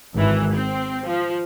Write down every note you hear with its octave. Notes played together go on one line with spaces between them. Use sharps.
G#1 E3
C4
F3